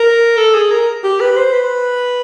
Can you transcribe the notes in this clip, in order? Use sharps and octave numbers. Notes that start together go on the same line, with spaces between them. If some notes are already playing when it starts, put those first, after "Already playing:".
Already playing: A#4
A4
G#4
A#4
G4
B4
C5
B4